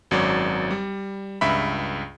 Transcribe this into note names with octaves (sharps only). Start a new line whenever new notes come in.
G#1 F#2 F#3 C#5 D5 D6
G3
C#2 G2 E5 B5